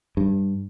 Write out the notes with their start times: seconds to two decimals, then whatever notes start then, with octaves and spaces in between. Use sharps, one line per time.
0.17 G2